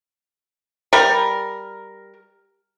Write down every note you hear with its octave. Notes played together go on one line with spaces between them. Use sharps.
G3 A#4